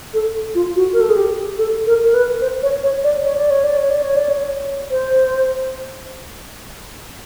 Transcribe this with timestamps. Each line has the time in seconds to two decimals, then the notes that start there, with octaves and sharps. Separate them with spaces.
0.14 A4
0.55 F4
0.76 F#4
0.93 A#4
1.01 A4
1.09 G#4
1.17 G4
1.58 A4
1.87 A#4
2.03 A#4
2.14 B4
2.41 C5
2.63 C#5
2.83 C#5
3.04 D5
3.24 C#5
3.37 D5
3.50 C#5
3.64 D5
3.77 C#5
3.90 D5
4.03 C#5
4.16 D5
4.29 C#5
4.91 C5